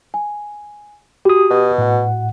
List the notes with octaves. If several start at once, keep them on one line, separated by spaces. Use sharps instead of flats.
G#5
F#4 G4 D#6
B2
A2 F#5